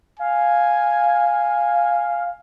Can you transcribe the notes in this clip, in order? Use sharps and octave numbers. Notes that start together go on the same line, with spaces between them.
F5 G#5